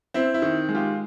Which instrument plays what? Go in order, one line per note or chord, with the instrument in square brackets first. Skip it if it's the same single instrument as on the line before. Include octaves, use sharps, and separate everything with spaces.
[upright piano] C4 E4
E4
D#3
G#3
F4 G4